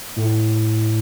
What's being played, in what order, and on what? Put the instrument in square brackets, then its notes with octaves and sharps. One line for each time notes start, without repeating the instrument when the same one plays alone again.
[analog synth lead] A2